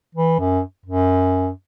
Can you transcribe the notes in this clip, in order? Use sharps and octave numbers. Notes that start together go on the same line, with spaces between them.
E3
F#2
F#2